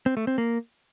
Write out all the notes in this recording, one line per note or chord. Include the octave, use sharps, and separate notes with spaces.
C4
A3
C4
A#3